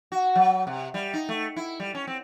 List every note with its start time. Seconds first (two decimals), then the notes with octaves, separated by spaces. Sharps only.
0.12 F#4
0.35 F#3
0.67 C3
0.94 G3
1.14 D#4
1.29 A3
1.56 E4
1.80 G3
1.95 C#4
2.07 C4